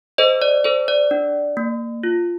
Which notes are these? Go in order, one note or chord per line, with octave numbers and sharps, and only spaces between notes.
A4 C5 D#5
D5
A4 C5
D5
D4
A#3
F4